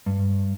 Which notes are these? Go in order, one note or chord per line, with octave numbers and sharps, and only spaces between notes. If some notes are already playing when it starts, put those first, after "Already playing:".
G2